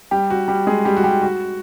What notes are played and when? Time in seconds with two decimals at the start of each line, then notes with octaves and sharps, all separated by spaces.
0.11 G3 G4
0.30 F#4
0.48 G3 G4
0.67 G#3 G#4
0.85 G3 G4
0.97 F#4
1.04 G3 G4
1.22 F#4